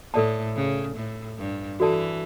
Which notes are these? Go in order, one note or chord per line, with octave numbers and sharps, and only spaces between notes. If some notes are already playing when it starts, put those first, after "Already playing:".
A2 A4 D5 A5
C#3
A2
G2
E3 F#4 A4 D5 A5